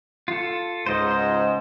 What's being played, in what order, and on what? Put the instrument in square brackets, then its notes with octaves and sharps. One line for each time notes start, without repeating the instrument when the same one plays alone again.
[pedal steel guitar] F4 A4
[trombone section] C#2 G#2 [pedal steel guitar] C5 D#5